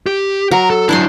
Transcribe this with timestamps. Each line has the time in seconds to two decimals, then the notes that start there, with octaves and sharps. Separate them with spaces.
0.06 G4
0.51 F#3 A#4 A#5
0.70 A4
0.89 F#3 D4 E4 C5 C6